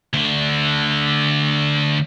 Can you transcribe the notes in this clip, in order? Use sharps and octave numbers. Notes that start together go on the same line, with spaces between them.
D2 D3